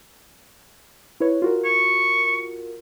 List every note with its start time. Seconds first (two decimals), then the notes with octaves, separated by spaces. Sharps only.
1.20 E4 B4 C#5
1.42 F4 F#4 A#4
1.65 C#6